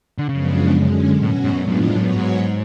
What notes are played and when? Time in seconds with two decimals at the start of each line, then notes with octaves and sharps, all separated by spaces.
0.18 D3
0.29 F#2 C#3 F3 G#3 B3 D4
0.71 F#2 D3 G#3 C#4
1.12 B2 F#3 C#4 F#4
1.22 A2
1.44 G#2
1.53 F#2 A2 G#3 B3 D4 F4
1.68 F#2
1.82 F2
1.90 G#2
1.95 F#2 F#3 B3 F#4 C#5
2.15 G#2